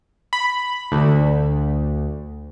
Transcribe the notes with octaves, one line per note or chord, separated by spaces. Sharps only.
B5
D2